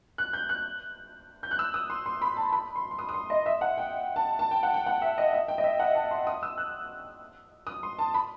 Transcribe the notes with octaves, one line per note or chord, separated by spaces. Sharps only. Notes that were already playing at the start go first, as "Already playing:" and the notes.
F#6
G6
F#6
G6
F#6
E6
D#6
C6
C6
B5
A5
B5
C6
C6
D#6
D#6
C6
D#5
E5
F#5
G5
A5
A5
G5
F#5
G5
F#5
E5
D#5
E5
G5
D#5
E5
F#5
A5
C6
D#6
E6
F#6
D#6
C6
A5
B5